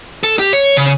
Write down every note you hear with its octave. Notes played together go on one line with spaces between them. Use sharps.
A4
G4
C#5
C#3